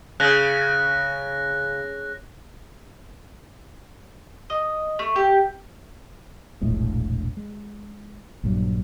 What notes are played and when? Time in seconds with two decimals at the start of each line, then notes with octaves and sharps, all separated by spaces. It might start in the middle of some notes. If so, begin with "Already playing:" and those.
0.20 C#3 F#6 A#6
4.50 D#5
4.99 A3
5.16 G4
6.61 E1 A#1 A2 G#3
7.37 G#3
8.43 A#1 G2 F#3